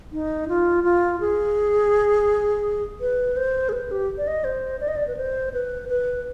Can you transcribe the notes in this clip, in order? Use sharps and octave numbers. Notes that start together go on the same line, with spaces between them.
D#4
F4
F4
G#4
B4
C5
G#4
B4
G4
D5
D#5
C5
D5
D#5
D5
B4
C5
B4
B4